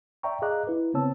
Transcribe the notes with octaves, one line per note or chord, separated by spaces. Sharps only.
D5 E5 G5 A#5 C#6
G#4 D#5 F5 A#5 D6 F#6
E4 B4
C#3 B3 C4 C#5 A5 E6